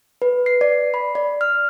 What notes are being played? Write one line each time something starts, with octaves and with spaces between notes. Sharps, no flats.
B4
C7
D5
B5
D5
F6